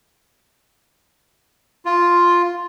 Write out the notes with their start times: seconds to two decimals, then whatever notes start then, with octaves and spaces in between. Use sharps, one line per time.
1.85 F4